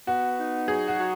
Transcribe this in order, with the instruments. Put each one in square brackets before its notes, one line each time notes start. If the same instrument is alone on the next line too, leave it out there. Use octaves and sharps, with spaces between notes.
[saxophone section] B3 [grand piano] F#4
[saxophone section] D#4
[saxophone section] F#3 [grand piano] G#4
[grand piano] F#4
[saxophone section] F#3